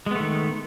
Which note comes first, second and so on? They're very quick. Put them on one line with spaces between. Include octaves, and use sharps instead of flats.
G#3 B3 A3 D#3